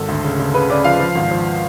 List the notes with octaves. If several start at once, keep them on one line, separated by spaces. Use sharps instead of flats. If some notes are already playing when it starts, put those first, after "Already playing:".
Already playing: G#1 A4
D2
C#3
C#3
C#3 B4
C#3 D5
F3 F5
F3
G#1
F3